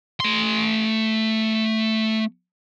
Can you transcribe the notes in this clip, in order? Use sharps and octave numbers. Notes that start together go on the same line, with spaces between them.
A3 C6